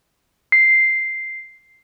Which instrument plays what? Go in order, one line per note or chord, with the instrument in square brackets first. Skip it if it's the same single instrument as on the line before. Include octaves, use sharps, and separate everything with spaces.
[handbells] C7